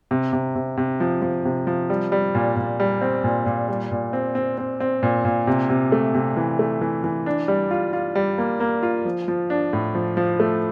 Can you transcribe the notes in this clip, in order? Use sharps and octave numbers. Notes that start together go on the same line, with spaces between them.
C3
C3
C3
C3
F3
F3
C3
F3
G3
G3
A#2
A#2
G3
C4
A#2
A#2
G3
A#2
C4
C4
C4
C4
A#2
A#2
C3
C3
A3
C3
E3
A3
E3
E3
D4
G3
F4
F4
G3
A#3
A#3
F4
F3
F3
D4
A2
F3
F3
A3